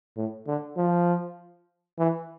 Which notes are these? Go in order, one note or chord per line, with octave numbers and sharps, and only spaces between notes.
A2
D3
F3
E3